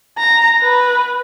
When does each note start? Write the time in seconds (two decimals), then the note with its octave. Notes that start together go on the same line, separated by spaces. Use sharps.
0.18 A#5
0.62 B4